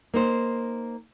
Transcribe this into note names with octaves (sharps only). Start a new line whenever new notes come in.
A#3 D#4 C5